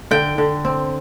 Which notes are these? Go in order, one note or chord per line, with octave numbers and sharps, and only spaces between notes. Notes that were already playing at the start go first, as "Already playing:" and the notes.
D3 G5
D3
C4